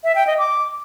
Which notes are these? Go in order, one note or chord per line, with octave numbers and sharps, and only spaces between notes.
E5
G5
D#5
D6